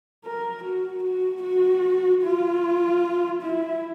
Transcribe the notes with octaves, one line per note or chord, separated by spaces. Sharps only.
A#4
F#4
F#4
F#4
F4
E4